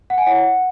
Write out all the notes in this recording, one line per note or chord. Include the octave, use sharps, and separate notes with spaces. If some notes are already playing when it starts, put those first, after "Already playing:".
F#5
G#5
E4 C#5 F#5